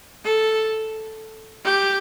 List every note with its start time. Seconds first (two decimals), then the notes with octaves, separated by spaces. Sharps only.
0.25 A4
1.65 G4